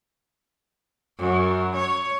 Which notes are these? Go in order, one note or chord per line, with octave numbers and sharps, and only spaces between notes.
F#2
C#5